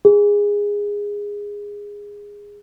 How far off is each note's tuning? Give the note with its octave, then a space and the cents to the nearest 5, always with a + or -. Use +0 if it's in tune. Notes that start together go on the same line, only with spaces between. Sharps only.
G#4 -15